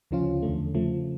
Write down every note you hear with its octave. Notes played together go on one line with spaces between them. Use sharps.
D2 C#3 F3 C#4 F4
E2 D3 A3
C#3 F3 A3